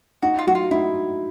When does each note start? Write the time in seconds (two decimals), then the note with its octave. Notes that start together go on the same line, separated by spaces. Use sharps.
0.22 D#4 F#4
0.39 F4
0.47 F#3 F#4
0.55 F4
0.71 D#4 E4